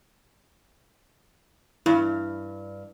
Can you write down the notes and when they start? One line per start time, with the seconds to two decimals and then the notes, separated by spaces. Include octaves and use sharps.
1.86 G2 E4